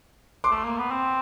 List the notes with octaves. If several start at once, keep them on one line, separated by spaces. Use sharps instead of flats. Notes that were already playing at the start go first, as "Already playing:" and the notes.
C6 D6
A3
A#3
B3
C4